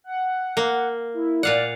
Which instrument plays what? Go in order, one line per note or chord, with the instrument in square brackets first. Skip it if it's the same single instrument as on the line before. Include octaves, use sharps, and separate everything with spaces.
[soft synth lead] F#5
[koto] A#3
[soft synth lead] E4
[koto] A#2 F5 F#5 [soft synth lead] D5